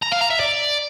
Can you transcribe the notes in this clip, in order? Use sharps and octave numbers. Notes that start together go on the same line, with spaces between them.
A#5
F5
A#5
E5
D5